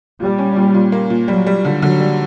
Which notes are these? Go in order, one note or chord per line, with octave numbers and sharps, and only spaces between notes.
A#2 G3
C#4
A#2
A#2
A#3
A#2
F#3 G3
G3
D3
D3 F#3
G3